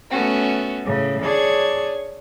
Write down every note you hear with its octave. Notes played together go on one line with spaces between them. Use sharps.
A3 B3 C#4 F#4
A2 C#3
D4 G#4 C#5 C#6 G#6